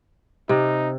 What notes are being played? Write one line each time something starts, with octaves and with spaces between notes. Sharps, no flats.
C3 D#4